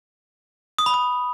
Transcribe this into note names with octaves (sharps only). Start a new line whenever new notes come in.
D#6
B5
D#6